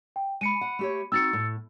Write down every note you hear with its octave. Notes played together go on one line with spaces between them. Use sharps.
G5
G#3 B5 C#7 D#7
F#5
A3 G4 C#5
C4 D#4 F#4 E6 A6 C#7
A2